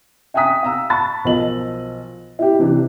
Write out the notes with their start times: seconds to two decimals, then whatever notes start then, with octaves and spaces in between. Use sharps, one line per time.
0.34 E5 G5 G#5 A#5 D#6 B6
0.63 F5 A#5 E6
0.90 A5 B5 C#6 A6
1.25 B1 F3 A#4 D#5 F#7
2.39 E4 G4
2.59 C3 E3 D4 G4